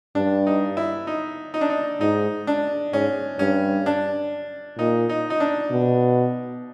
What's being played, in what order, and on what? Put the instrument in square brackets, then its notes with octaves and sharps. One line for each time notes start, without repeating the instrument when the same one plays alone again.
[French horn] G2 [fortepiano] D4
[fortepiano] D#4
E4
D#4
D#4
D4
D#4
[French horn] G#2 [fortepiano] D#4
[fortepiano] D4
[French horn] G#2 [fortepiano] C#4
[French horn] G2 [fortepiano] C#4
[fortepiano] D4
[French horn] A#2 [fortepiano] D#4
[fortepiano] D#4
D#4
D4
[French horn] B2